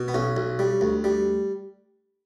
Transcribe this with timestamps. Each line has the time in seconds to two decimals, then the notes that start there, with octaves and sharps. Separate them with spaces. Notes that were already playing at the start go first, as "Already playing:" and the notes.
Already playing: B2
0.08 B3
0.14 B1 C#4
0.37 B1
0.59 G3
0.81 D2
1.04 G3